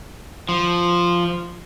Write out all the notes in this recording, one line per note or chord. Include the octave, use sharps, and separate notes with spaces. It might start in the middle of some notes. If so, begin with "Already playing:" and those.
F3